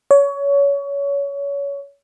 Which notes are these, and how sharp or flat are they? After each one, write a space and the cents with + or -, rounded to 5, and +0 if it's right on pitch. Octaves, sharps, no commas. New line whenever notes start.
C#5 +25